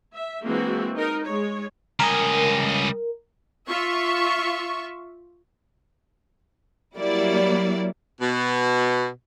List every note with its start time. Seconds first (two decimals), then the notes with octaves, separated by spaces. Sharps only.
0.11 E5
0.44 E3 G#3 A#3 C4 F#4
0.97 D#4 A#4
1.26 G#3 C#5
2.00 C#2 G3 A#4 D#5 G#5
3.68 F4 E5 C#6
6.96 F#3 G3 A#3 E4 D5
8.20 B2